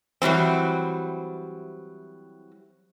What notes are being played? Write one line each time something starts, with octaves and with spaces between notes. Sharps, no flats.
E3 F#3 G3 C4